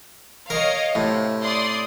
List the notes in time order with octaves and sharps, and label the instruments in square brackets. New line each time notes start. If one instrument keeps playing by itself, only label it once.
[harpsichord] A#4 [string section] C#5 D#5 F5
[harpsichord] A2 [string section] C3
[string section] D5 C6 D#6